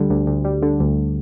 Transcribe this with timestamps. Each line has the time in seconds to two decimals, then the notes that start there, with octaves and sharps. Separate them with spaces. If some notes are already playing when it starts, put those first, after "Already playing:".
Already playing: D2 D3 G3
0.10 D2
0.27 D2
0.45 G3
0.63 D3
0.80 D2